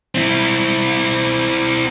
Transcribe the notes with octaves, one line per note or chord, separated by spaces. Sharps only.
C4 E4